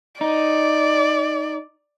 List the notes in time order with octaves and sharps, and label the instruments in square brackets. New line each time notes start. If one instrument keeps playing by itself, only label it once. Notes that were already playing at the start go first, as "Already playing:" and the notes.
[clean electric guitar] D#4 [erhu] D5